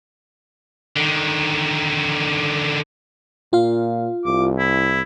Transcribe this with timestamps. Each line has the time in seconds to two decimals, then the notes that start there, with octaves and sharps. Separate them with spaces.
0.96 D3 D#3
3.53 A#2 F4 F5
4.25 C2 D6
4.59 E4